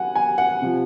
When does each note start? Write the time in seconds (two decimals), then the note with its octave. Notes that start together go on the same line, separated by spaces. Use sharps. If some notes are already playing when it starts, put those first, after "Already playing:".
Already playing: F#3 F#5 G#5
0.15 G#5
0.38 F#5
0.62 C3 F3